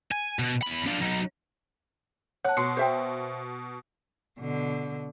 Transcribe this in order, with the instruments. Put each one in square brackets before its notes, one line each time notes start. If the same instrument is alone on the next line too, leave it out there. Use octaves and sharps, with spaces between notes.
[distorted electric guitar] G#5
B2
E2 B5
D4 F4
F#3 D#4
[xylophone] C#5 A5 [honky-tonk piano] F#5 [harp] F#6
[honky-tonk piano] B2 [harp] C6 [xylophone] C#7
[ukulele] C5 E5 G5
[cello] B2 D3